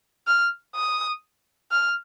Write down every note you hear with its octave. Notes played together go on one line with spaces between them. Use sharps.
F6
D#6
F6